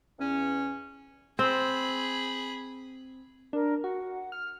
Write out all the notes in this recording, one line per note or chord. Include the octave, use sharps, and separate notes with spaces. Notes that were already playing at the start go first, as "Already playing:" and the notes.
E2 C#4
C4 G#4 B5
D4 A#4
F#4 F#5
F6